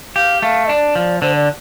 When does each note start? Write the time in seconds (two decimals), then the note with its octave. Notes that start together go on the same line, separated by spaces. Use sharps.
0.16 G4 F5
0.42 A3 F5
0.69 D4 D5
0.95 F3
1.22 D3 C5
1.35 D5